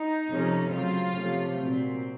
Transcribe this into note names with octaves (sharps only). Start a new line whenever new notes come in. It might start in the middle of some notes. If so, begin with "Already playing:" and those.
Already playing: D#4
C3 F3 A3 C#4
C#3 F#3 C4 F4
C3 F3 A3 C#4
A#2 F#3 C4